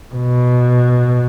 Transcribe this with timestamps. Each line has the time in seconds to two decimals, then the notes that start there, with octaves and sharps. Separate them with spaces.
0.14 B2